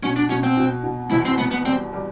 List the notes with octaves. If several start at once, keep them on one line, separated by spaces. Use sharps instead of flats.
B2 C#4
D4
B2 C#4
C4
B2
B2
E2 E4
C4
E2 B3
B3
G3 C4
G3